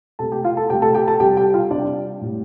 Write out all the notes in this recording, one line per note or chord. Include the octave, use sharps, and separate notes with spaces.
C3 A3 A4 A5
G4 G5
F4 F5
A4 A5
C3 A3 G4 G5
A4 A5
G4 G5
A4 A5
C3 G3 G4 G5
G4 G5
F4 F5
C3 G3 D4 D5
A2 G3